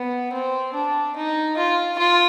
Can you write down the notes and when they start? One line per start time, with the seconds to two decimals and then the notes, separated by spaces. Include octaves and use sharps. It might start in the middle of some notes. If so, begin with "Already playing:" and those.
Already playing: B3
0.33 C4
0.74 D4
1.16 D#4
1.57 F4
1.99 F4